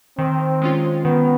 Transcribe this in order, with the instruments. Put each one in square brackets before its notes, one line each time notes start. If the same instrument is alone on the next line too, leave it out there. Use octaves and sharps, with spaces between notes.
[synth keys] D#3 [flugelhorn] C4
[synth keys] G#3 C#4 F4
[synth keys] D#3 [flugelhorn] B3